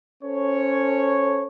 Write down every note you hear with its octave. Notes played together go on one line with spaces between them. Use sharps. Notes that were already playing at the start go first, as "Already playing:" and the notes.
C#4 A4 C5 C#5